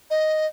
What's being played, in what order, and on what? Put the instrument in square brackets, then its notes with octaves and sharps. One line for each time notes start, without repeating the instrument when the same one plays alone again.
[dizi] D#5